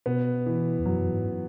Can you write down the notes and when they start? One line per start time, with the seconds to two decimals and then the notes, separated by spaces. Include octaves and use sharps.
0.06 B2 B3
0.46 E3
0.79 E2
0.86 F#2 F#3
1.12 G#2